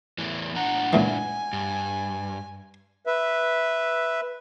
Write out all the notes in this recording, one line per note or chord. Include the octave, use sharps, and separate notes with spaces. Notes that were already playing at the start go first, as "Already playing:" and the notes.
E2 A2 E3
A2 D4 F#5 A#5
C#2 A#2 E3 G#5
G2
B4 E5